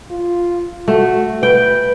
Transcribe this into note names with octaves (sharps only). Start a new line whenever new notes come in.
F4
A3 F#4
B4 G5